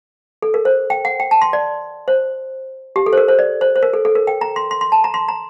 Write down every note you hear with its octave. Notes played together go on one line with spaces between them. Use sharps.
A4
A#4
C5
G5
F#5
G5
A5
C6
D5
C5
G4
A4
C5
A#4
C5
D5
C5
C5
A#4
A4
A4
A#4
G5
A#5
C6
C6
C6
A5
A#5
C6
A#5